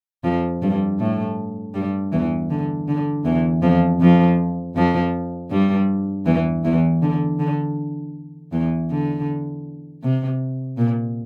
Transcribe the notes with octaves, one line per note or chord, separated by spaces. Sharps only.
F2 F3
G2 G3
A2 A3
G2 G3
E2 E3
D3
D3
E2 E3
F2 F3
F2 F3
F2 F3
G2 G3
E2 E3
E2 E3
D3
D3
E2 E3
D3
C3
A#2